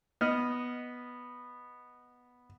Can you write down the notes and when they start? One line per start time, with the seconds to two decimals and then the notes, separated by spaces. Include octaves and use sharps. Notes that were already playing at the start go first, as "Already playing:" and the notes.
0.21 B3 D#5 F6